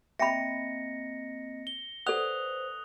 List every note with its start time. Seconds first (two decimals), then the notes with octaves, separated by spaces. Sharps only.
0.19 A#3 C4 D#5 E5 G5 B5 A#6 C#7
1.67 G7
2.06 A4 B4 C5 D5 F#5 D#6 F#6 F7